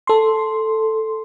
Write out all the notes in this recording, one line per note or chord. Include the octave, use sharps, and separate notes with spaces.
A4 C6